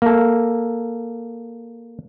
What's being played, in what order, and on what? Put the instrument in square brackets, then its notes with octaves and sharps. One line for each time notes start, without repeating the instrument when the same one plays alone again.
[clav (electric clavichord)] A#3 A4